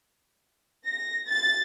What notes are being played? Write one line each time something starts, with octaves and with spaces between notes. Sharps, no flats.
A#6
A6